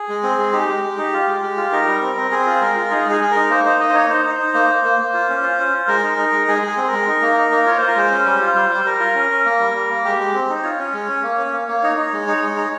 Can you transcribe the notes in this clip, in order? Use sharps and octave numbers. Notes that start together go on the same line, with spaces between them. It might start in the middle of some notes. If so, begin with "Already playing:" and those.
Already playing: G#4
G#3
C4
G#3
D#4 G4
G#3
G#3
D#4
F4
G#3
G#3
F4
D#4 A#4
G3
C4
C4
C4 G#4
F4
C5
G#3 A#4
F4
D#4 G#4
G#3
G#4
G#3
D#4 A#4
A#3 C5
D#4 C5
A#3 D#5
C5
D#4 C#5
D#4 C5
D#4
D#4
A#3
A#3
A#3
A#3
F4
C#4
F4
C#4
F4
G#3 A#4
D#4
D#4
G#3
G#3 G#4
G#3
G#4
C4
A#4
G#3
D#4
A#3
D#4
A#3
F4 C#5
F4 C5
A#4
G#3 C5
C#4
G3
F4
G3
G3
G3 A#4
F4
C#4
C#4
A#3
G3
G3
A#3
G#3 G4
G#3
C4
D#4
C5
F4 C#5
C#4
G#3
C#4
A#3
C#4
A#3
A#3
D#4 C#5
D#4
G#3
D#4
G#3
D#4